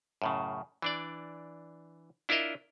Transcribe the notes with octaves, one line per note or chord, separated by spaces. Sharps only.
F#2 A2 C#3
E3 D4 D5
D4 E4 F4 A#4 D#5 E5